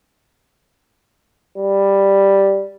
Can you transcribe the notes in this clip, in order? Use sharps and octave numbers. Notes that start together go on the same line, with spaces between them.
G3